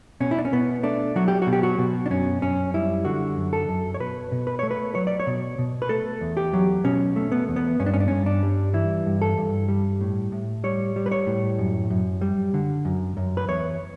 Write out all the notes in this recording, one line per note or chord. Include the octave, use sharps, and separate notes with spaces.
B2 C#4
E4
D4
C#4
B2 B3
A3 D4
F#3 F#4
G4
F#4
B2
G4
F#4
B2
D4
F#2 C#4
F#2 C#4
G3 E4
D3 F#4
F#2
A4
F#2
C#5
B2 B4
B2
B4
A3 C#5
B4
F#3 C#5
D5
C#5
B2
B2
B4
A3 A4
E2
G4
F#3
B2 C#4
A3
B3
E2
B3
G2 C#4
D4
C#4
D4
G2 C#4
D4
G3
E3 E4
G2
A4
G2
G3
A2
A2
G3 C#5
G3
B4
C#5
A2
F#2
F#2
G3
D3
F#2
F#2
B4
E2 C#5